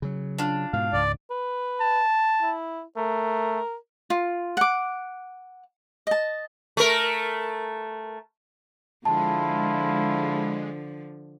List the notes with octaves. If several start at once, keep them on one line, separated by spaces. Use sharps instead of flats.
C#3 F#3
D4 F4
G#2 B2 F5
C#2 G#2 D5
B4
A5
E4
A3 A#4
F4
F#5 D6
D#5 A5
A3 A#4
D3 F3 G#3 E4 F4 A5